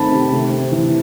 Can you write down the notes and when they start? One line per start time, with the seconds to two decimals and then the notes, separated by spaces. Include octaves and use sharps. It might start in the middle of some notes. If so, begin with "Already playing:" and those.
Already playing: D#3 A3 C4 A5 B5
0.12 C3
0.32 A3
0.51 C4
0.72 E3